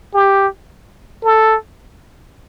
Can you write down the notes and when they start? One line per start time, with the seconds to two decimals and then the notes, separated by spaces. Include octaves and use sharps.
0.14 G4
1.24 A4